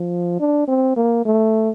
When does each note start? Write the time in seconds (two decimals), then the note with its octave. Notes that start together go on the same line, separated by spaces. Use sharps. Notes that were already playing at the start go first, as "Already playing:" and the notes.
Already playing: F3
0.40 D4
0.68 C4
0.96 A#3
1.25 A3